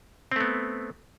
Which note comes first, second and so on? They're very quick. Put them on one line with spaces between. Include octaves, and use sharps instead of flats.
C4 A3 B3